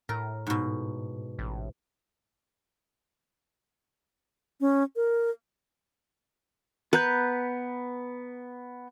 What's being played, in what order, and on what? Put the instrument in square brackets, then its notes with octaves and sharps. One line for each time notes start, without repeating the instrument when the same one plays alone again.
[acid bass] A2 [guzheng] A#4
[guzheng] G#2 B2
[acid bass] A1
[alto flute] C#4
A#4
[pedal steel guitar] B3 A#5 G6 [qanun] B4